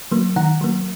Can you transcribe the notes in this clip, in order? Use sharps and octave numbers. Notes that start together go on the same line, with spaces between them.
F#3 A#3
D#3 F#5 A#5
F#3 A#3